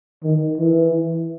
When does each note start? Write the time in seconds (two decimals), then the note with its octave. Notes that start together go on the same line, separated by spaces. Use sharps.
0.23 D#3
0.58 E3